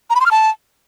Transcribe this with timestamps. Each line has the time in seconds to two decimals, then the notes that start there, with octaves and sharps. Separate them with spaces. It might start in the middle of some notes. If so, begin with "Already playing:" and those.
0.10 A#5
0.15 B5
0.20 C6
0.26 F6
0.31 A5